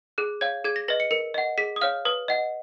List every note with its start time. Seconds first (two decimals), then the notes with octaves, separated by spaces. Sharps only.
0.18 G#4 F#6
0.41 C#5 F5 G#6
0.64 G#4 G#6
0.76 A#6
0.88 B4 D#5 A#6
1.00 C#7
1.11 A#4 C#7
1.34 D#5 F#5
1.58 G#4 B6
1.76 D#6
1.81 C#5 F5 F6
2.05 B4 D#6
2.28 D#5 F#5